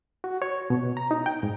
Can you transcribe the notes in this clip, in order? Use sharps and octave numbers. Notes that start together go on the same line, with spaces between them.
F#4
C#5
B2
A#5
D#4
G5
G#2